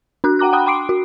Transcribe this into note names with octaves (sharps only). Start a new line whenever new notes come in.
D4 F#4 F#6
F#5 G5 A#5 D6 F#6
F#5 G5 A#5 B5 D#6 F#6
G5 C6 D6 C7 D7
F#4